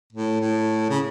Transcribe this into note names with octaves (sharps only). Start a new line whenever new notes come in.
A2
A2
C#3